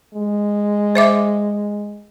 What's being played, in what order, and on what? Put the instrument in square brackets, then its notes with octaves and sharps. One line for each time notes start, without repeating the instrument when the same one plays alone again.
[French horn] G#3
[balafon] C5 E5 D6